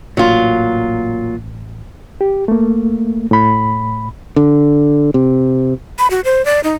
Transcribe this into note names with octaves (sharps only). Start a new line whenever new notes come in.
A1 A#2 F#3 F4
G4
A3 A#3
A2 B5
D3
C3
B5
F#4
C5
D5
D#4